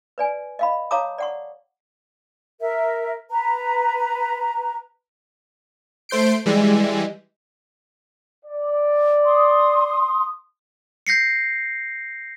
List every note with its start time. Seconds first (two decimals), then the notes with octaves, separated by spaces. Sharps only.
0.18 B4 D5 G#5
0.59 D#5 F5 B5
0.91 C#5 F5 A5 A#5 D6 D#6
1.18 D5 F#5 C#6
2.60 A#4 E5
3.30 B4 A#5
6.09 A3 C5 G6 C7 D7
6.46 E3 G3 G#3
8.45 D5
9.24 C6 D#6
11.07 G6 A#6 C7 C#7